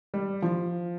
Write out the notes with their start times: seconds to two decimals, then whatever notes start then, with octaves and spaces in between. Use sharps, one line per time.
0.14 G3
0.42 F3